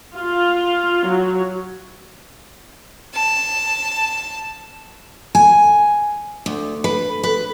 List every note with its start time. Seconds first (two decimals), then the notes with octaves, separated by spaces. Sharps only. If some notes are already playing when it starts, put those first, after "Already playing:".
0.16 F4
1.07 F#3
3.13 A5
5.35 G#5
6.46 D2
6.84 B4
7.23 B4